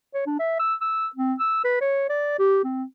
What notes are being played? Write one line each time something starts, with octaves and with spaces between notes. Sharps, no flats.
C#5
D4
E5
E6
E6
C4
E6
B4
C#5
D5
G4
C4